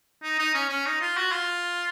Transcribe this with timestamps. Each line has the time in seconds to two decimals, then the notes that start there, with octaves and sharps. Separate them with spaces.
0.23 D#4
0.38 D#4
0.54 C#4
0.69 C#4
0.86 D#4
1.01 F4
1.17 F#4
1.32 F4